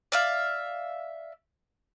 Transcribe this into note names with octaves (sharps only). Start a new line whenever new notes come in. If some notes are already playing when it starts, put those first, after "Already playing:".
D5 E5 F5